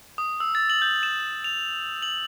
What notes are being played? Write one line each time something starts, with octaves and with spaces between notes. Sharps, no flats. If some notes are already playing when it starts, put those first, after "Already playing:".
D#6
E6
A6
F#7
G6
E7
F7
F#7